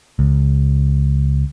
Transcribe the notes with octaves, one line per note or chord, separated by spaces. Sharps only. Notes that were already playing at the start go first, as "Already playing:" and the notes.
C#2